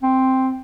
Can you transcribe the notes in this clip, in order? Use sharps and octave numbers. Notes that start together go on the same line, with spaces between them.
C4